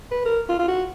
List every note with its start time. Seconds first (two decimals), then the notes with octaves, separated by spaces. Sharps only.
0.11 B4
0.25 A#4
0.49 F4
0.59 F4
0.68 F#4